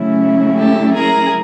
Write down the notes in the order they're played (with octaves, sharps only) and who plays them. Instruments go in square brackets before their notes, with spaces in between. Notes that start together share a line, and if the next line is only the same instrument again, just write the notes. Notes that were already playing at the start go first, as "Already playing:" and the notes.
Already playing: [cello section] C#3 F#3 A3 C#4 E4
[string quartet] G4 A4
G#4 A#4